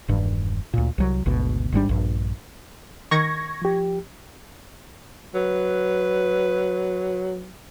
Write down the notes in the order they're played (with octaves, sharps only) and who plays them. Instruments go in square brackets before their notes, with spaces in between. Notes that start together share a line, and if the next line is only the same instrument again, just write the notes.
[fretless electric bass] E1 G2 D#3
D2 A#2
C2 F#3
G#1 D2 B2
G#1 G#2 G3 D4
A#1 G2
[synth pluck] D#3 [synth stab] C#6 G#6 A#6
[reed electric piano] F3 G4
[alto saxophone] F#3 [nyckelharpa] B4